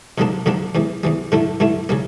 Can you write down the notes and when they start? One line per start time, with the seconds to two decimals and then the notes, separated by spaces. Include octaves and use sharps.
0.18 F2 D3 G3 A#3 D4
0.46 F2 D3 G3 A#3 D4
0.75 E2 E3 G3
1.04 E2 E3 G3
1.32 G2 D3 A3 E4
1.60 G2 D3 A3 E4
1.89 C#3 G3 A#3